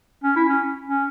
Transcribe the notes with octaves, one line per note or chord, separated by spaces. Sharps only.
C#4
E4
C#4
C#4